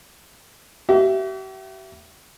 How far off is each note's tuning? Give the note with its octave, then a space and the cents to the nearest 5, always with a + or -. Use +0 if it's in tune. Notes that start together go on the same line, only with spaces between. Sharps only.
G4 -45 E5 +20